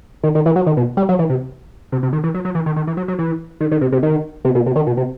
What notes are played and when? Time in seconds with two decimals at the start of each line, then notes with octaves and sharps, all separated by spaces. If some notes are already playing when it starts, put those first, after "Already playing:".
0.23 D#3
0.35 D#3
0.46 E3
0.56 F#3
0.66 D#3
0.77 B2
0.97 G3
1.09 F#3
1.19 E3
1.30 C3
1.92 C3
2.03 C3
2.13 D#3
2.24 E3
2.34 F#3
2.45 F#3
2.55 E3
2.66 D#3
2.76 D#3
2.87 E3
2.97 F#3
3.08 F#3
3.19 E3
3.61 D#3
3.71 D#3
3.81 C3
3.92 C3
4.03 D#3
4.45 C3
4.55 B2
4.66 C3
4.76 D#3
4.87 B2
4.97 C3